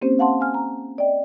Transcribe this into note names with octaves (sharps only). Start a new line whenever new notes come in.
A#3 C4 C#4 G4 C5
F5 F#5 A5 C6
F5 G#5 F6
A#5
D5 D#5 G5